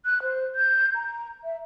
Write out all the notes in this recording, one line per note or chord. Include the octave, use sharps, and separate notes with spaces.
F#6
C5
G6
A#5
E5